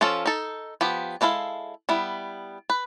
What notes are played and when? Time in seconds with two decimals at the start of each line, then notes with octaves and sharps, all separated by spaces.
0.01 F3 C#4 F4 A4
0.26 D#4 A4
0.81 F3 B3 G4
1.21 G#3 D4 E4 A4 F5
1.89 G3 B3 E4
2.70 B4